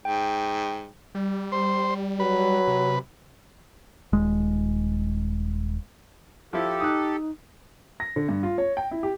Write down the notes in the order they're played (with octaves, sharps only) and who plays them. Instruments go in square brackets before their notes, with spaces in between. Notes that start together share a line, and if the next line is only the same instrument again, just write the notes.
[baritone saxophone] G#2 [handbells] G5
[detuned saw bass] G3
[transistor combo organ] C5
[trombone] F#3 [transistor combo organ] B4
[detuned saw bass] C3
[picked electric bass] D#1 G#3
[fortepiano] F3 E4 [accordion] G4 A4
[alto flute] D#4 [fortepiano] D#6 F#6
[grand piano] A#6
D3
G2
F4
C#5
G5
E4
G4